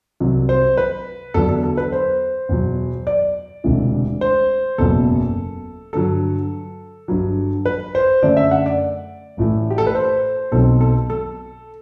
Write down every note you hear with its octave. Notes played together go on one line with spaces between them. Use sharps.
C2 C3 F#3
C5
B4
E2 D3 F#3 B3 D4 A4
A4
A4
B4
C5
E2 B2 F#3
D5
E1 D2 C3 E3
C5
F#1 E2 B2 F#3 A4
G2 D3 F#3 A4
G1 G2 F#3
B4
C5
F#2 D3 A3 D4 D5
E5
F#5
D5
A1 A2 E3 A3
G4
A4
B4
C5
B1 B2 F#3 C4 A4
A4
A4